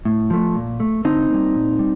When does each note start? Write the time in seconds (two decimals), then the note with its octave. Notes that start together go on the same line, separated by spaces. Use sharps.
0.05 A2
0.30 F3 A3
0.55 A#2
0.80 A3
1.05 D3 C4 D#4
1.30 G3 A#3
1.54 A#2
1.79 G3